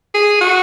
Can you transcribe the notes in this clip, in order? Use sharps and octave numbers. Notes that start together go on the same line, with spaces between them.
G#4
F#4